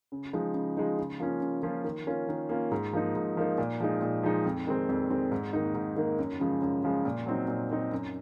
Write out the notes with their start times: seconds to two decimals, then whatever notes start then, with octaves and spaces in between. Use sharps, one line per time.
0.12 C#3
0.33 F3 G#3 D#4
0.54 C#3
0.77 F3 G#3 D#4
0.98 C#3
1.20 F3 A#3 C#4 F4
1.41 C#3
1.63 F3 A#3 C#4 F4
1.84 D#3
2.07 A#3 C#4 F4
2.28 D#3
2.49 A#3 C#4 F4
2.71 G#2
2.93 F3 A#3 D#4
3.15 G#2
3.37 F3 A#3 D#4
3.58 A#2
3.80 F3 G#3 D#4
4.02 A#2
4.23 F3 G#3 D#4
4.45 F2
4.67 D#3 G#3 C4
4.89 F2
5.10 D#3 G#3 C4
5.32 G#2
5.53 D#3 A#3 D#4
5.74 G#2
5.96 D#3 A#3 D#4
6.19 F#2
6.40 C#3 F3 G#3
6.62 F#2
6.84 C#3 F3 G#3
7.05 A#2
7.26 F#3 C4 D#4
7.48 A#2
7.70 F#3 C4 D#4
7.92 F#2